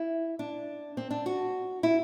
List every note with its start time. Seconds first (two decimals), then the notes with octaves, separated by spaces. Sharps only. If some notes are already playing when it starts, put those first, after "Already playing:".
Already playing: E4
0.39 D4
0.97 C4
1.11 D4
1.26 F#4
1.83 E4